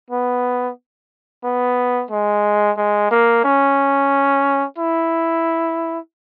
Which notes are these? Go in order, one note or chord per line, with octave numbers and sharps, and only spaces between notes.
B3
B3
G#3
G#3
A#3
C#4
E4